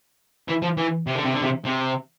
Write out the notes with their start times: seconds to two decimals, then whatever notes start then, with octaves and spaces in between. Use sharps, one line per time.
0.48 E3
0.62 F3
0.77 E3
1.07 C3
1.15 D3
1.24 C3
1.34 D3
1.42 C3
1.65 C3